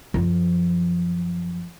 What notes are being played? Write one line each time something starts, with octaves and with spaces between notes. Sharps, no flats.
F#2 F3